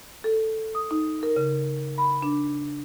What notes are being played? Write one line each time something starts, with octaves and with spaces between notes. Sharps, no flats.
A4
D#6
D#4
A#4
C#3
B5
D4